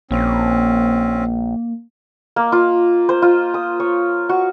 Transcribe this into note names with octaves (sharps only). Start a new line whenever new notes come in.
A#1 A#3 C4 C#4
A#3
F4
C5
F4
D#6
C#5
F#4